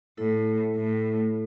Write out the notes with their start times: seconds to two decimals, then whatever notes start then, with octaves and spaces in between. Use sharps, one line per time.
0.18 A2 E4 A4
0.76 A2